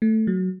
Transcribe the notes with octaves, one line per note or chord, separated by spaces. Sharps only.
A3
F#3